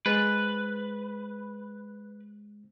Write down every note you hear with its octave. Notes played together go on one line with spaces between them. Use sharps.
G#3 B4 C5 A6